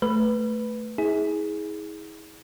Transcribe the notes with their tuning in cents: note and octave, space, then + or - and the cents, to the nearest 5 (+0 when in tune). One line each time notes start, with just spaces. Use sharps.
A3 +0 B4 +0
E4 -40 G#4 +0